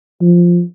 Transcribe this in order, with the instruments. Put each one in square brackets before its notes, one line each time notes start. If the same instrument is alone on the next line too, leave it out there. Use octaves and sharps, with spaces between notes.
[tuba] F3